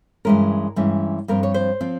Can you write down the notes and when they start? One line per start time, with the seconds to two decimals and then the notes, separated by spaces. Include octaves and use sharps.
0.25 G2 E3 G#3 C#4 A#4
0.76 G2 E3 G#3 C#4
1.28 G2 F3 C4 A#4
1.43 C#5
1.54 C5
1.81 F3 C4